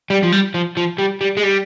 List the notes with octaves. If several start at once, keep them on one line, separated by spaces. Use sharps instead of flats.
G3
F3
G3
F3
F3
G3
G3
G#3
G3